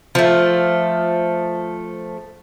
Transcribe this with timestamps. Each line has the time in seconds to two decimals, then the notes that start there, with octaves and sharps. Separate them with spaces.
0.15 F3 A3